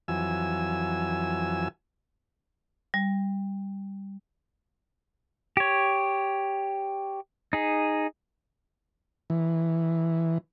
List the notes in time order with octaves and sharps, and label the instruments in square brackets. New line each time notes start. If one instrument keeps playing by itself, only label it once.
[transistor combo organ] F2 E3 F#3 G#5 E6
[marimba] G3
[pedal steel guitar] G4 C#5
D#4 G#4
[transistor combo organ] E3